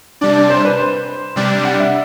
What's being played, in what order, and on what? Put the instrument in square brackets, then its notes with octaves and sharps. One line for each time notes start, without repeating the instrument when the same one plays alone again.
[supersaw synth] C3 G3 D4 [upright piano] D5
[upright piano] C5
B4
C5
[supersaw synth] C3 G3 D4 [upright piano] D5
[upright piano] F#5
D5
E5